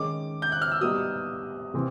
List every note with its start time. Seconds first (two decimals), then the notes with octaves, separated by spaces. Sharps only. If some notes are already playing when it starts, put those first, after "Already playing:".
Already playing: D#3 G#3 C#4 D6
0.42 G6
0.52 F#6
0.62 F6
0.72 E6
0.81 G3 B3 D#4 G4 D#6
1.74 C3 E3 C4